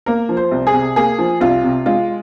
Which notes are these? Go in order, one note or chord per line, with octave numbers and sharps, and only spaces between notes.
A#3 A#4
F3
C5
C2
G#4
C3
A#3 G#4
F3
C2 F4
C3
G#3 F4